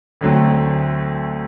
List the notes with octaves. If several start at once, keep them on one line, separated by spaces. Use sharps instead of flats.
D2 D3 F#3 A3 C4